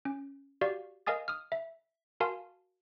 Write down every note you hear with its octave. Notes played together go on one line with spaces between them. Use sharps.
C#4
F#4 G4 D5 F5
A#4 D#5 F5 G#5 D#6 A6
D#6 F6
E5
F#4 A#4 F5 G#5 A5 C6